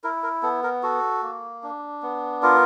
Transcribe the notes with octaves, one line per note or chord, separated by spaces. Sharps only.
E4 A#4
A#4
B3 A4
A#4
F#4 A4
A#3
D4
B3
F4 A#4